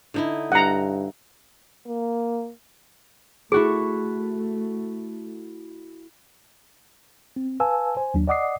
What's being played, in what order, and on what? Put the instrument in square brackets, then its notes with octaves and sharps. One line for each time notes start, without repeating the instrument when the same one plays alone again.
[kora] D3 D#4 E4
[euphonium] G2 [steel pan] F#5 A#5
[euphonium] A#3
[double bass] A3 [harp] E4 F#4 A4 [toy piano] G#4
[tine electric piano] C4
B4 F5 G#5 A5 E6
C5 G#5
D#2 F#3 D4
D5 D#5 F#5 D6 D#6 C7